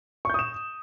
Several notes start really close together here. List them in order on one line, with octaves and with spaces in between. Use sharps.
C#6 G6 D#6 E7